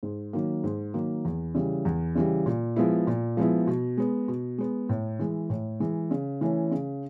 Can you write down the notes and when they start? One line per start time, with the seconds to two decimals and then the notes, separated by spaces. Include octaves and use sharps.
0.03 G#2
0.33 D#3 F#3 A#3
0.64 G#2
0.94 D#3 F#3 A#3
1.25 E2
1.55 C#3 E3 G3
1.85 E2
2.15 C#3 E3 G3
2.46 A#2
2.76 F3 G#3 B3 E4
3.07 A#2
3.37 F3 G#3 B3 E4
3.67 B2
3.97 G#3 B3
4.28 B2
4.58 G#3 B3
4.89 A2
5.19 E3 G#3
5.50 A2
5.80 E3 G#3
6.11 C#3
6.41 E3 A3 C#4 E4
6.72 C#3